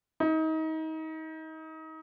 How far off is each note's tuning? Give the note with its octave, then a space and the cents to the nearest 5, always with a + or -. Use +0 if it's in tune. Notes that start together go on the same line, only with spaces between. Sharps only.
D#4 +30